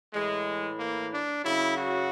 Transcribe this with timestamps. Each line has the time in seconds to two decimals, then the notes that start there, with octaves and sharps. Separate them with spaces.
0.14 A2 E3 G#3
0.79 A#3
1.12 D4
1.45 F#2 C#3 F#3 E4
1.77 F#4